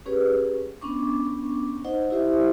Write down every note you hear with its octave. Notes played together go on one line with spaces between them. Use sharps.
C#4 G4 G#4 B4 C#5
B3 C#4 D4 C#6 D6
D#4 C5 D#5 F#5
E4 G4 C5 E5